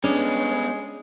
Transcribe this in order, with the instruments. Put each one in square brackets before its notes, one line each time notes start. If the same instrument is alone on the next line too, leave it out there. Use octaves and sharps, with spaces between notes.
[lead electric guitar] G3 B3 [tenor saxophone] G#3 [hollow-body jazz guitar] C#4 [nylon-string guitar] D4